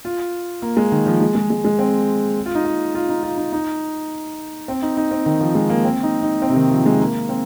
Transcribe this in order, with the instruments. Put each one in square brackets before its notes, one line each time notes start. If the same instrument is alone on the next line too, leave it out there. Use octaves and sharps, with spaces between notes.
[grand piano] F4
A#3
G#3
D#3
F3
G#3
G#3
G#3
G#3
C4
F4
D#4
F4
F4
D#4
F4
D#4
D#4
C4
D#4
D#4
C4
D#3
F3
G#3
A#3
C4
D#4
D#4
C4
C3
D#3
F3
G#3
A#3
C4